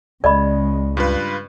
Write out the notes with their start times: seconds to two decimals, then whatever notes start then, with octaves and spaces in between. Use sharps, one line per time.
0.24 C#2 C#3 G#3 D5 D#5 B5
0.97 G2 F4 B4